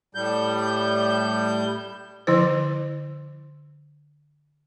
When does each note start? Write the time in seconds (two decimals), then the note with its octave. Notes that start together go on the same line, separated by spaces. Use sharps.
0.15 A2 G3 G6
2.27 D3 F3 E4 C5